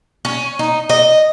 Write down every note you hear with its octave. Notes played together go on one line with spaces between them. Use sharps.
C#4
D#4
D#5